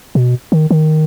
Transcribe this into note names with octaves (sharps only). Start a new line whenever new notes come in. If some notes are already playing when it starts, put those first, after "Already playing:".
B2
D#3
D#3